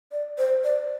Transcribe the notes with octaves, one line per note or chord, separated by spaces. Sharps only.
D5
C5
D5